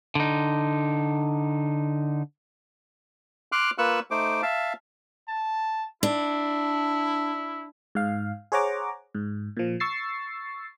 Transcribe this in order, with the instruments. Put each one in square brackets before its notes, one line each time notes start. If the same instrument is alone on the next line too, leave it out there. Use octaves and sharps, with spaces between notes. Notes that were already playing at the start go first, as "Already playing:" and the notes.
[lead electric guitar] D3 D#4
[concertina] C6 D6 F6 F#6
A#3 F4 B4 C#6 E6 F#6
A3 D#4 C5 D6
E5 F5 A5
[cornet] A5
[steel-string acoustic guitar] D4 [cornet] E4
[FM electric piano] G#2 F5
G#4 C5 C#5 F#5 A#5 D6
G#2
A#2 F3
C#6 E6 A6 C7